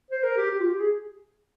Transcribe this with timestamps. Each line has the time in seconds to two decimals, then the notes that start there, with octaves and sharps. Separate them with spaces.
0.11 C5
0.23 A#4
0.37 G4
0.50 G4
0.61 F4
0.70 G4
0.80 G#4